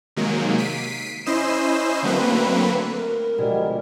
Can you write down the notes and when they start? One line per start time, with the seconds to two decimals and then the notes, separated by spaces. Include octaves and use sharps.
0.16 C3 D#3 F#3 G#3 A#3
0.58 B6 C7 D7 D#7
1.26 C#4 E4 C5 D#5 C7 E7
2.03 D3 F#3 A3 A#3 C4 B4
2.97 A#4
3.38 D2 B2 F3 G3 G#3